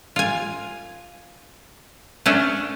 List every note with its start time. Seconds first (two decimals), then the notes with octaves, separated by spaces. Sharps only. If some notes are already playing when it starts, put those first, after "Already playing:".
0.16 F4 G#5
2.26 A3 C#4 D4